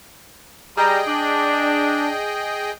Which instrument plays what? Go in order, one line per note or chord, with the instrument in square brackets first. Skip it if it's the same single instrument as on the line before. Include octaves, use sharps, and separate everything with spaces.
[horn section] G3 A#5 [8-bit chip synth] G#4 D#5 G5
[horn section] D4